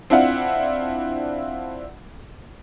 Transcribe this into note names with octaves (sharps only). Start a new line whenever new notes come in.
C4 D4 E4 F4 F#5